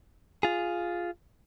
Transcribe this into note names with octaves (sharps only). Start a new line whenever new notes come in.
F4 G#4